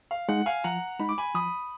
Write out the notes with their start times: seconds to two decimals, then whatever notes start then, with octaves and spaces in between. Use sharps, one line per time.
0.11 F5
0.29 G#3 D#4 F#5
0.46 F5 G#5
0.64 F3 F#5 A#5
0.99 G#3 D#4 B5
1.09 D6
1.18 G#5 B5
1.34 F3 B5 D#6